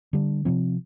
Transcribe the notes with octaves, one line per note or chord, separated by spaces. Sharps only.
D3 G3 D4
C3 F3 C4